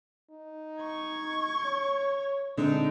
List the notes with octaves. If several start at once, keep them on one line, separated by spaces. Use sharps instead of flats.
D#4
C#6 G#6
C#5
D3 G#3 C4 D4 D#4